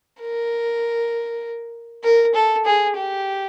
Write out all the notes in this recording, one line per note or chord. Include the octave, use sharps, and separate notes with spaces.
A#4
A#4
A4
G#4
G4